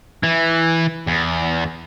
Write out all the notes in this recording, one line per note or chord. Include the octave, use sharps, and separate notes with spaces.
E3
E2